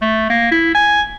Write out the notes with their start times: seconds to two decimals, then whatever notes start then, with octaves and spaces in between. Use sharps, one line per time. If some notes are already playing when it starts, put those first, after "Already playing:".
0.02 A3
0.30 A#3
0.51 E4
0.75 G#5